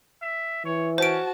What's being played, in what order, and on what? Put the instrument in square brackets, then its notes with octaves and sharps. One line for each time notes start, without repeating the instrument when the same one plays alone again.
[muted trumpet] E5
[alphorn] E3 [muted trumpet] C#5
[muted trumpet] C#4 [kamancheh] F#4 A5 [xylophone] C5 D7